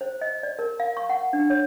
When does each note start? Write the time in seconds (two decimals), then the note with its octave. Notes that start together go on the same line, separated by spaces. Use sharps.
0.01 C5
0.21 D#5
0.43 D5
0.59 A#4
0.80 F5
0.97 C#6
1.09 F#5
1.33 D4
1.50 C#5